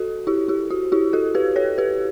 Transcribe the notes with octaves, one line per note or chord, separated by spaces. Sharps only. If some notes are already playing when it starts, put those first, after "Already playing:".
Already playing: F#4 A4
E4 G4
E4 G4
F#4
E4 G4
F#4 A4
G4 B4
A4 C#5
G4 B4